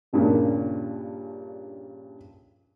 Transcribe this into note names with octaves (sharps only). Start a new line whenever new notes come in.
A#1 G2 A#2 C#3